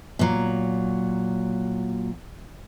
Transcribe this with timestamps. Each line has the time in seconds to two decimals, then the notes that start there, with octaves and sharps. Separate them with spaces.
0.19 A#2 F#3